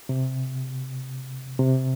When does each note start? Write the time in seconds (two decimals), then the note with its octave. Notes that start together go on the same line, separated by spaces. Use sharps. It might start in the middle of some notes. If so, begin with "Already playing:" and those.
0.09 C3
1.59 C3